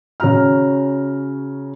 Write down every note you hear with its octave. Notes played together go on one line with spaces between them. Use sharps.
C#3 C#4 F#4 A#5 F6